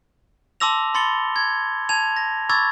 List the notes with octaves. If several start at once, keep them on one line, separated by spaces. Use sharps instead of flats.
A5 C6 D6 E6 A#6 F7
B5 C6 A6 C#7 G7
G#6
A5 G#6 F7
A#6
B5 C#6 D6 E6 G#6 A6